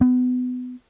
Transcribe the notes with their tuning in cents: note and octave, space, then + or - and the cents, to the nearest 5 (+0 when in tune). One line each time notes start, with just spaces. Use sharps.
B3 +25